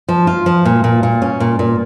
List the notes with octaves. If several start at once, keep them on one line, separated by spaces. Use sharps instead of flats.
F3
F4
F3
A#2
A#2
A#2
C#4
A#2
A#2